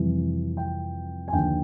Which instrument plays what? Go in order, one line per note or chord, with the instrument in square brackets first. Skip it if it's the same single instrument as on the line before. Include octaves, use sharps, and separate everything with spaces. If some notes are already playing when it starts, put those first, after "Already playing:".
Already playing: [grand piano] F2 C3 E3 G3
G5
G#5
D#2 D3 F3 G5